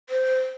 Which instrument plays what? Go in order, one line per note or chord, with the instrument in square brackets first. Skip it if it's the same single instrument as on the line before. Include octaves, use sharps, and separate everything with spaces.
[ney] C5